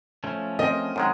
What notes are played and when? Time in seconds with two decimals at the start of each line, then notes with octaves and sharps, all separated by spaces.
0.24 F3 A3 C#4
0.59 C4 A#4 D#5
0.96 F#2 D#3 G#3